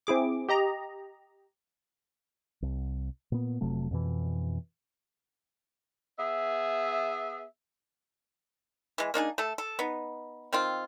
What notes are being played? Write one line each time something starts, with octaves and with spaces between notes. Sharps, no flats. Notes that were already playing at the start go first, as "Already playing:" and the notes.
C4 E4 G#4 D6
G4 D#5 A#5
C2
A#2 B3
F1 C3 F#3 A3
F2 B2 E3
B3 G#4 E5
E3 G#3
A#3 D4 D#4 G#4
A3 A4
A4
B3 D#4
D#3 C4 F4